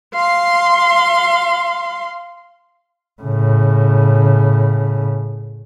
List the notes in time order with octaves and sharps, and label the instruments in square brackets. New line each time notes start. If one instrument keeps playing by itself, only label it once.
[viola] F5 C6
[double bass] A2 C#3